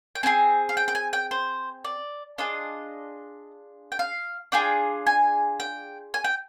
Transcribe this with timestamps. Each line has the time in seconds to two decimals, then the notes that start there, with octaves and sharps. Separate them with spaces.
0.15 G5
0.23 C4 F4 G#4 G#5
0.69 F5
0.77 G5
0.88 G5
0.95 G#5
1.13 G5
1.31 C5
1.85 D5
2.38 D4 F4 G#4 D#5
3.92 G5
3.99 F5
4.52 D4 F4 G#4 G5
5.07 G#5
5.60 G5
6.14 G#5
6.24 G5